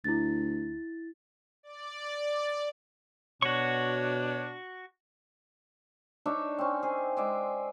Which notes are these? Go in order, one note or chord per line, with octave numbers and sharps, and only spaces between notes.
D2 E4 A6
D5
B2 D4 F#4 C#5 C#6
D4 D#4 C#5 E5
C4 C#4
G#4 C5
G#3 G#4 D5 E5